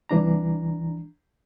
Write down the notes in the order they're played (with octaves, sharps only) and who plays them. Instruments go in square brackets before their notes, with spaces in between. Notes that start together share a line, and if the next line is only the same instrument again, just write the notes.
[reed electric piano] C2 E3 D4 A#5